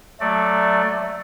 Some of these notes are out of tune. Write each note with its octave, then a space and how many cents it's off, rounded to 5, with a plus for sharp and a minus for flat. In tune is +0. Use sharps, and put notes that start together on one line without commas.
F#3 +0 A3 +0 D5 +10